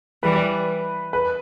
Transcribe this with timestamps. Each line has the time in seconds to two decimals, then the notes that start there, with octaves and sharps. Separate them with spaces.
0.23 E3 G3 B4
1.13 B4